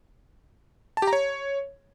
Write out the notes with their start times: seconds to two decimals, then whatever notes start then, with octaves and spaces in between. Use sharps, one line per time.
0.97 A5
1.02 G4
1.07 A#5
1.13 C#5